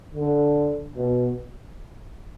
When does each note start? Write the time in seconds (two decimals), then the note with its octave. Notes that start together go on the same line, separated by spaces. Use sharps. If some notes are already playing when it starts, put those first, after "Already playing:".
0.15 D3
0.96 B2